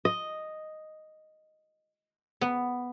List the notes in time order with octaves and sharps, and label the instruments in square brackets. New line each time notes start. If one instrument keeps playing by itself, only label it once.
[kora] D#5
[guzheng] B3